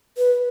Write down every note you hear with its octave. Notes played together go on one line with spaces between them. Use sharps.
B4